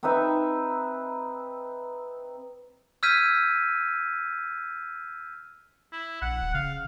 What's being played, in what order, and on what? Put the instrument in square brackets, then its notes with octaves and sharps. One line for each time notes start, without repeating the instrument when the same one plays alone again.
[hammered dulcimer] C4 D#4 B4 E5
[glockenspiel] E6 F6 G6 G#6 B6 D#7
[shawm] E4
[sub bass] A#1 [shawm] F#5
[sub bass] D1
[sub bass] C#3 [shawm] F5